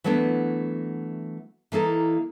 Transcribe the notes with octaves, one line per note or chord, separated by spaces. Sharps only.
E3 F#3 A3 B3 D4
E3 A#3 D#4 A4